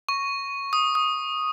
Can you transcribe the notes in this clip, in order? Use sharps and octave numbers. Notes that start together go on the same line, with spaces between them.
C#6
D#6
D#6